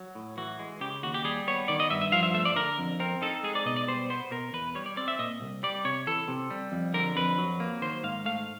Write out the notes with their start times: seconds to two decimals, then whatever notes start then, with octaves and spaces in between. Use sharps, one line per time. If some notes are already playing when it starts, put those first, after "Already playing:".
Already playing: F#3
0.15 A2
0.37 E3 F#4
0.59 G#3
0.81 C#3 G4
1.03 D#2 F#4
1.14 G4
1.24 G3 G#4
1.47 B3 C#5
1.68 D#3 D5
1.80 D#5
1.90 G2 E5
2.02 E5
2.12 F3 F5
2.23 E5
2.34 A3 E5
2.45 D5
2.56 D3 A#4
2.79 F2
3.00 C4 A#4
3.22 D#4 A4
3.43 G#3 G#4
3.55 D5
3.65 B2 D#5
3.76 D5
3.88 G3 C5
4.10 B3 C5
4.31 B2 A#4
4.53 E2 B4
4.75 G3 C#5
4.86 D5
4.97 C4 D5
5.08 E5
5.19 A#2 D#5
5.41 C2
5.63 G3 D5
5.85 C3 C#5
6.07 E3 A4
6.28 C3
6.50 G3
6.72 F2
6.94 D3 A#4
7.16 F2 B4
7.38 F#3
7.60 A#3
7.81 D#3 C5
8.03 G#2 F5
8.25 A3 F5